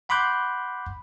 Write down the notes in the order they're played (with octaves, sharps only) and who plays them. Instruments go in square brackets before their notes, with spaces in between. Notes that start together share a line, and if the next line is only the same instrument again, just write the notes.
[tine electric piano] F#5 B5 C6 D6 F#6 G6